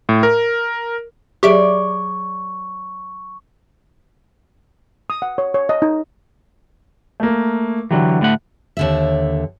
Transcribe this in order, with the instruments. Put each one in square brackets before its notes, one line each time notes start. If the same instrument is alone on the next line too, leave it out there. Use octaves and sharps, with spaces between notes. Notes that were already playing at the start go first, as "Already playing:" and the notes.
[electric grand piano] A2
A#4
[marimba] F#3 G#4 [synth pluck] G4 E5 D7 [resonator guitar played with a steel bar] C#5 D5 [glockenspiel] C#6
[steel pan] D#6
F#5
C#5
C#5
D#5
D#4
[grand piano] A3 A#3
[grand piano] D3 G4 [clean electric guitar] E3 F#3
[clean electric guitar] A2 A3 F#5
[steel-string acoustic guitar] D#2 D3 E5